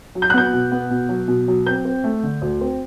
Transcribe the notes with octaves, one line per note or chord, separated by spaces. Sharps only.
F#3
G6
F#6
B3 G6
B2
B3
B2
F#3
B2
F#3
C4 G6
C4
A3
D3
D2
C4